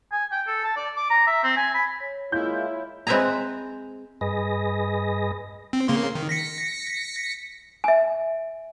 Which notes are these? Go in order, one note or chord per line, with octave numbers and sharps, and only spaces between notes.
G#5
G5
A4
A5
D5
D6
A#5
E5
C4
G#5
B5
C#5
G#3 A#3 E4 F4 C#5 E5 G6
G#3 C4 B4 E5 G#5 A#5
G2 G#4 B4 D#5 A#6
C4
C#3 A#3 C6
D#3
A#6 B6 C#7
E5 G#5